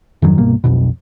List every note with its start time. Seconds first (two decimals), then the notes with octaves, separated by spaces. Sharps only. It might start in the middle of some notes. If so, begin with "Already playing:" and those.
0.22 F2 G#2 D#3 F#3
0.38 C2 G2 B2 A#3
0.64 B1 F2 B2